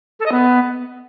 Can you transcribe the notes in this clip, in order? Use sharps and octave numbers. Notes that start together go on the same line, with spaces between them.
A4
D#5
B3